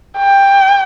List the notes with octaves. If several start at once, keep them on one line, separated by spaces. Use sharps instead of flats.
G5